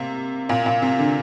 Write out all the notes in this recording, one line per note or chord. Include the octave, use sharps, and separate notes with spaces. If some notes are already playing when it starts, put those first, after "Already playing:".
Already playing: C3 A#3
A#2
A#2
C3
D3